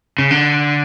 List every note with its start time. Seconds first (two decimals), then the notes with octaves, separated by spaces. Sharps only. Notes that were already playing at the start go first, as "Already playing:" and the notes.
0.19 C#3
0.31 D3